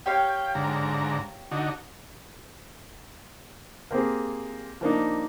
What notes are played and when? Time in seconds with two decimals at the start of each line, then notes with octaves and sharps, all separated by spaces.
0.06 G4 C#5 F5 G5
0.55 G#2 D3 A#5
1.52 D3 D#4 F#4
3.91 A#3 C4 G4 G#4
4.81 F3 A#3 D4 D#4